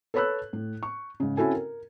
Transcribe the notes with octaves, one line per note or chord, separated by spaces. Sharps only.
A4 B4 C#5 B5 E6 F#6
A2
C#6
G#2 C#3
C4 C#4 E4 F#4 A4 G#5
A#4